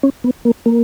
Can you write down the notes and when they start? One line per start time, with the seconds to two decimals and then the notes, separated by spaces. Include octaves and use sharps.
0.03 C#4
0.24 B3
0.45 A#3
0.66 A#3